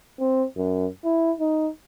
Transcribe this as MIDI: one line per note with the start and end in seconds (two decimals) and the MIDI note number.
0.19 0.44 60
0.57 0.86 42
1.04 1.31 64
1.40 1.69 63